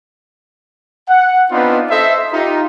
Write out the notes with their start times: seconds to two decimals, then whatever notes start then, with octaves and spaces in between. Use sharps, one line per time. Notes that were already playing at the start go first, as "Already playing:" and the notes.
1.09 F#5
1.51 B3 C4 D4 D#4 F4 B4
1.91 A4 C5 D#5 E5
2.33 D#4 F4 G4